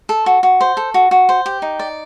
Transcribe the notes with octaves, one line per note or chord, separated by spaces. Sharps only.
A4
F#4
F#4
C5
A4
F#4
F#4
C5
G4
D#4
D5